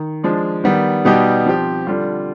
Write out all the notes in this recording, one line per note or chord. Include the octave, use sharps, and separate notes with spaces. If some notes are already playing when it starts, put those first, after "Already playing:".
Already playing: D#3
F3 G#3 D4
D#3 G3 B3
B2 G3 B3 D#4 G4
F3 C4 G4
D3 G3 D4 F4